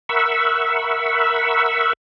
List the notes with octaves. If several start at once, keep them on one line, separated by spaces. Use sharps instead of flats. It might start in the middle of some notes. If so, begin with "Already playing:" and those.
A#4 E5 F#5 B5 C#6 E6